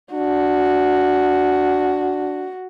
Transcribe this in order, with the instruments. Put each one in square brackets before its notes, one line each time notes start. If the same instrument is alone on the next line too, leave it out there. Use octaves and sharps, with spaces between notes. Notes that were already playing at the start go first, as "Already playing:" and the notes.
[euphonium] D4 [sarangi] F#4